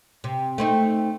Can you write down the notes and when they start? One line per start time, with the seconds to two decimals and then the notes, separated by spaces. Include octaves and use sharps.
0.24 C3
0.58 A3 C4 D#4